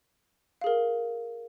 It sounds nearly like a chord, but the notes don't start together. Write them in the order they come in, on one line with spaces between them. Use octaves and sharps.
F5 G#4 A#4